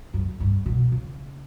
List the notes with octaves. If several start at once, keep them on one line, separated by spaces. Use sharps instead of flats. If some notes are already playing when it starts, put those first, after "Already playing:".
F#2
G2
B2
C#3